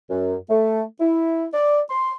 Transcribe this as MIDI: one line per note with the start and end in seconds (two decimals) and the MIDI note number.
0.10 0.35 42
0.50 0.81 57
1.00 1.45 64
1.54 1.79 74
1.90 2.13 84